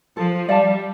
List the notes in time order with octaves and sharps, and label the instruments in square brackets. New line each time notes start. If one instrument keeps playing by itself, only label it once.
[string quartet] F3 [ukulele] A4
[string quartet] G3 [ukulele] D5 F5 A5